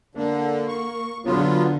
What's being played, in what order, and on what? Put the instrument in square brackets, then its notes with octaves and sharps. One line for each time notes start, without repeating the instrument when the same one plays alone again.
[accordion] D3 [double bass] A#3
[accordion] C#6
[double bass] D3 [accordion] F#3 B3 F4